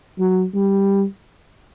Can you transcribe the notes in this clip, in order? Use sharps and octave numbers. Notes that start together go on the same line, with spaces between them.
F#3
G3